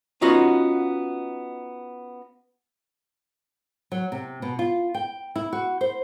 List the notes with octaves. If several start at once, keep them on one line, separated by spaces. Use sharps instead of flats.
B3 C#4 D#4 F4 F#4
F#3
C3
B2
F4
G5
E4
F#4
C5